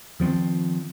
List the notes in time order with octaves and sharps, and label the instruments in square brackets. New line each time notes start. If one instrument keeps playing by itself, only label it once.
[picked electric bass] D#3 F3 B3 C4